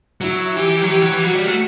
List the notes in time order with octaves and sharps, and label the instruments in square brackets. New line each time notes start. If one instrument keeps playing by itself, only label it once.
[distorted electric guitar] F#3 [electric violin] E4
[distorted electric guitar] E3 [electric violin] G4
[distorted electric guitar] F#3
[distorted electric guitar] E3 [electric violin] G4
[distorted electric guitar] F#3
E3
[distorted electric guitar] F#3 [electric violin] F#4
[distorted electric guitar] G3
A3